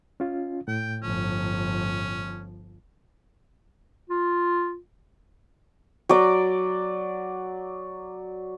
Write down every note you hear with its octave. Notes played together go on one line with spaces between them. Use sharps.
C#4 F4
A2 G5
G1 F3 C#4
F4
F#3 D5 D6